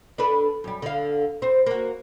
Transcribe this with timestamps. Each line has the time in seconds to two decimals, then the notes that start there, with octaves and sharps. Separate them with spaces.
0.18 D4 A4 B4
0.64 F#2 G3
0.82 D3 F5
1.42 C4 C5
1.66 A#3 F#4